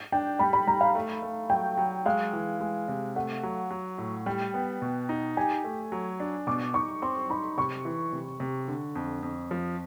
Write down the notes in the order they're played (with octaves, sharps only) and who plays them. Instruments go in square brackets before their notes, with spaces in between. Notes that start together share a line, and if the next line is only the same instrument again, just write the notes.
[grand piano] D4 [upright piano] G5
[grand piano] G3 [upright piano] B5
[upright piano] B5
[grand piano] G3 [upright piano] A#5
[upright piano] F5
[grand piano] A3
A3
[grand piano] F#3 [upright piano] G5
[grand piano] F#3
[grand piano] G#3 [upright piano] F5
[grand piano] E3
G#3
C3
[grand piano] A3 [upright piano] F#5
[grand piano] F#3
F#3
A2
[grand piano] G3 [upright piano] G5
[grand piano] B3
B2
D#4
[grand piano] G4 [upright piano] G#5
[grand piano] A3
F#3
D4
[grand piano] B2 [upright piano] D6
[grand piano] D#4 [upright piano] C#6
[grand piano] C4 [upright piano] C6
[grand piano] D#4 [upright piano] B5
[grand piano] C3 [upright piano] C#6
[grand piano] E3
C3
C3
D3
F2
F2
F3